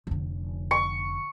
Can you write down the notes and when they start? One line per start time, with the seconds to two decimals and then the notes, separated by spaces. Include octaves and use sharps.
0.07 F1 D3
0.71 C#6